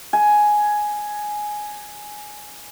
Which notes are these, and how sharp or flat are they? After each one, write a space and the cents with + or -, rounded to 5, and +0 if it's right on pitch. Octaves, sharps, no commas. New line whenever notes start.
G#5 +5